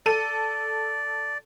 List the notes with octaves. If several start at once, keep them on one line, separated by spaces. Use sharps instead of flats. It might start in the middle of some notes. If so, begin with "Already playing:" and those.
A4 D5 D#7